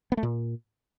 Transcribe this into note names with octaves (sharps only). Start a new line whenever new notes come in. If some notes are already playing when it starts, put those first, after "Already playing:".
B3
A3
A#2